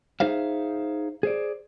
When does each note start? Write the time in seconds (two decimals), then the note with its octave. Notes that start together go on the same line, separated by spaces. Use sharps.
0.20 D#4 G#4 C5 E5 F5
1.23 G#4 C5 D5